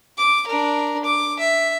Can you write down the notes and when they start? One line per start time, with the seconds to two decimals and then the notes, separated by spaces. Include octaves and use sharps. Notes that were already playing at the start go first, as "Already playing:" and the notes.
0.18 D6
0.47 D4 A#4
1.05 D6
1.39 E5